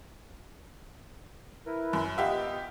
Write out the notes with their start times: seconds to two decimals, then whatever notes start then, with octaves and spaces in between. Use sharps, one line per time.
1.66 E4 A#4 B4
1.93 F#2
2.18 B3 F4 G4 D#5 E5 F#5